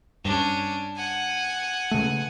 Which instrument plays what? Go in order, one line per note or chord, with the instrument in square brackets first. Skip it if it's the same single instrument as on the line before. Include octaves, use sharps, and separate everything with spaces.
[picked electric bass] G2 [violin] C#4 D4
[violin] F#5 G#5
[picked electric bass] C#3 A3